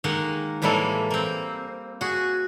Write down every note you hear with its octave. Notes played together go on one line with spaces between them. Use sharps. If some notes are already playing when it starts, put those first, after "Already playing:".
D#3 G#3 A#3 F#5
A2 E3 G3 G#3 A#3 A4
A#3 C4
F#4 G#4